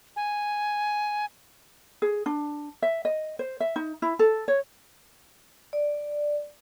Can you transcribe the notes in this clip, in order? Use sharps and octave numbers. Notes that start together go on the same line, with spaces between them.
G#5
G#4
D4
E5
D#5
C5
E5
D#4
E4
A4
C#5
D5